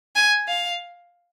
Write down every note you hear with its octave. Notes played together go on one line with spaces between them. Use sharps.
G#5
F5